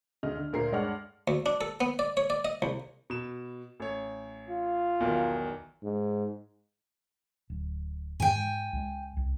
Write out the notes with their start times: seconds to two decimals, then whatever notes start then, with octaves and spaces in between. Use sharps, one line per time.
0.23 D2 C#3 D#5 F6
0.37 D3
0.53 D2 A#2 A#4 C5 C7
0.72 G2 G#3 C#5 D5 F#5 F6
1.28 D2
1.46 D4
1.61 A4
1.81 B3
1.99 D5
2.17 C#5
2.30 D5
2.45 D#5
2.62 C2
3.10 B2 E7
3.80 A1 C#5
4.49 F4
5.00 B1 E2 D#3
5.83 G#2
7.50 D1
8.20 G#2 G#3 G5 G#5
8.73 C#2 G#3
9.17 C2